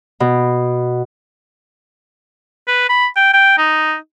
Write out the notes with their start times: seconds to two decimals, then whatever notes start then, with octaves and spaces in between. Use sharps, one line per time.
0.20 B2
2.68 B4
2.89 B5
3.16 G5
3.34 G5
3.58 D#4